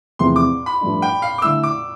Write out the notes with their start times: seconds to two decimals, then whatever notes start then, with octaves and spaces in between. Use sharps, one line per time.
0.19 E2 C3 F3 A3 C4 C6
0.36 D6
0.66 B5
0.81 G2 F3 A3 D4
1.02 G5
1.22 F5
1.38 D6
1.42 D3 A3 E4 E6
1.63 D6